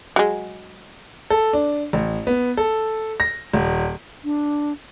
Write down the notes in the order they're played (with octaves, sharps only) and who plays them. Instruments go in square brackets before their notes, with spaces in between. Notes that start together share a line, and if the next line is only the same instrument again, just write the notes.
[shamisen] F#3 G#3
[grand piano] A4
D4
A1
B3
A4
A#6
D#1
[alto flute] D4